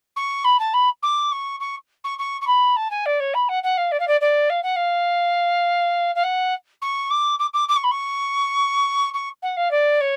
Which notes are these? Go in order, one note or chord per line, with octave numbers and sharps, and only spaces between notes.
C#6
B5
A5
B5
D6
C#6
C#6
C#6
C#6
C#6
B5
A5
G#5
D5
C#5
B5
F#5
F#5
F5
D5
F5
D5
D5
F5
F#5
F5
F5
F#5
C#6
D6
D6
D6
D6
C#6
B5
C#6
C#6
F#5
F5
D5
C#5